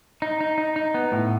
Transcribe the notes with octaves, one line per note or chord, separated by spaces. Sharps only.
D#4
D#4
D#4
D#4
B3
A2